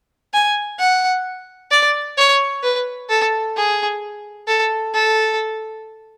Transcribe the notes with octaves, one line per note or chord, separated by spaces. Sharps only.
G#5
F#5
D5
C#5
B4
A4
G#4
A4
A4